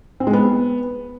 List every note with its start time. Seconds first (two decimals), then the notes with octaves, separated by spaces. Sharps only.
0.20 C4
0.27 G#3
0.33 B3